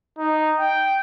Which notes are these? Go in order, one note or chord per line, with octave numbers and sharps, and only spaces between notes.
D#4
G5